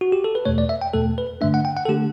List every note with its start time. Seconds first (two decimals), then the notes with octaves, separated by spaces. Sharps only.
0.01 F#4
0.12 G4
0.24 A4
0.35 B4
0.45 E2 B2 A3 C#5
0.58 D5
0.69 E5
0.82 G5
0.93 E2 B2 A3 A4
1.18 B4
1.41 G2 D3 A3 D4 E5
1.54 F#5
1.65 G5
1.77 F#5
1.85 A4
1.88 D3 A3 D4 G4